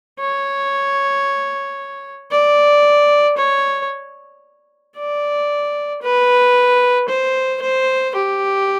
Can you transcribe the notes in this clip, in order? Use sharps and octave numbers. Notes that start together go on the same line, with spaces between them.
C#5
D5
C#5
D5
B4
C5
C5
G4